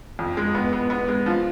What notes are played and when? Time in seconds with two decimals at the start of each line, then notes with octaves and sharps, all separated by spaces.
0.19 F2
0.37 G#3
0.55 B3
0.73 B3
0.90 B3
1.08 G#3
1.26 F3